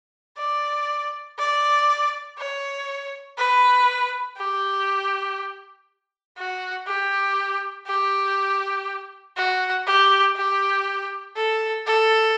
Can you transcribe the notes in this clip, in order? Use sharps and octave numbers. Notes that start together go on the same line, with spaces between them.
D5
D5
C#5
B4
G4
F#4
G4
G4
F#4
G4
G4
A4
A4